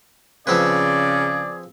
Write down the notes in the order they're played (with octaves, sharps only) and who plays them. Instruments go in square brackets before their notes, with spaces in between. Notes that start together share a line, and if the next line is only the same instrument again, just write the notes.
[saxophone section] C#3 [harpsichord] F3 C4 B4 [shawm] G#4 [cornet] D5